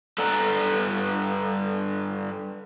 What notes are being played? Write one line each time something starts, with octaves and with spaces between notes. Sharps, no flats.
G2 A4 B4 D5 F#5 A#5